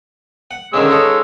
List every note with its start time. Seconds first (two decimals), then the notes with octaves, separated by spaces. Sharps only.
0.51 F#5
0.74 D3 D#3 G#3 C#4 E6
0.91 D#4 A4 C#5